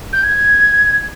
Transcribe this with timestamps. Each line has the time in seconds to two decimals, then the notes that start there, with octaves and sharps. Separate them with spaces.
0.13 G6
0.24 G#6